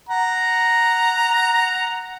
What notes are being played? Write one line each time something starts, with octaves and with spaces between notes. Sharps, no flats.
F#5 A#5